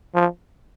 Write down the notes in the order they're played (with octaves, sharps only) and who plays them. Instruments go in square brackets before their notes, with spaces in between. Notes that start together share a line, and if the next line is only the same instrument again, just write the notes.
[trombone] F3